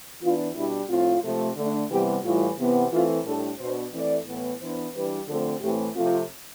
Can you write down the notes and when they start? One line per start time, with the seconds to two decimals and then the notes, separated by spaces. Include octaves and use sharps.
0.22 E3 B3 D4 F4
0.55 B2 G3 D4 E4
0.89 A2 F3 C4 F4
1.23 C3 F3 A3
1.56 D3 A3 D4
1.90 C3 E3 G3 B3 G4
2.24 A2 E3 G3 F4
2.58 C3 E3 B3
2.91 E3 A3 C4 F4
3.25 A2 G3 D4 A4
3.59 B2 B3 D4 C5
3.93 E3 A3 C4 D5
4.26 A2 E3 B3
4.60 E3 B3 D4 C5
4.94 E3 G3 D4 B4
5.28 D3 F3 A3 C4 A4
5.61 A2 E3 A3 C4 G4
5.96 C3 F3 A3 C4 F4